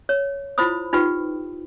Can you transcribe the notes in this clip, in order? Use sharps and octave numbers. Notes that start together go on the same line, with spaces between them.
C#5
E4 F4 C5 B5 D#6
D#4 F4 G4 B4 G5